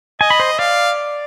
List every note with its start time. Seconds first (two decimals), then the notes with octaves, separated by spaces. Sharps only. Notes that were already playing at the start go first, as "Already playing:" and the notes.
0.21 D#5 G#5
0.30 B5
0.40 C5
0.59 D5 F5